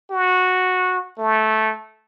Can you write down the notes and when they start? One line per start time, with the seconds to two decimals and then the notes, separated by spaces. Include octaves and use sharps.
0.11 F#4
1.18 A3